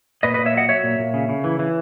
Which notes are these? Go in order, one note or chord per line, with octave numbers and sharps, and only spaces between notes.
A#2 B4 D#5
A#2 B4 D#5
C#5 E5
F#3 D#5 F#5
F#3 C#5 E5
A#2
A#2
C#3
C#3
E3
E3